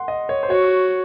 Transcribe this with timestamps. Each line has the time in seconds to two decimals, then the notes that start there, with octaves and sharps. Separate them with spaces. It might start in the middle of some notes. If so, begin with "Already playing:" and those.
Already playing: F#5 C6
0.08 D#5
0.29 C#5
0.43 C5
0.50 F#4 C#5